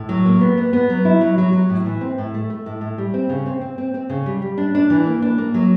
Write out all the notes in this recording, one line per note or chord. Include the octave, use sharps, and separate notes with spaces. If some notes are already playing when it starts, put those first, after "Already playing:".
Already playing: A2
F#3
A#3
B3
B3
B3
F#3
E4
F#3
F#3
F#3
A2
E3
C4
A2
A3
A3
A2
A2
G3
C4
C#3
C4
C4
C4
C4
C#3
G3
G3
D4
D4
E3
A#3
D4
A#3
F#3